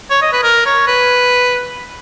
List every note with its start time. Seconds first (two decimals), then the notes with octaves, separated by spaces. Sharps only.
0.10 C#5
0.22 D#5
0.33 B4
0.43 A#4
0.66 C#5
0.87 B4